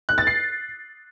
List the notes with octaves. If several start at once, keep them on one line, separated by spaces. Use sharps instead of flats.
F#6
A6
C7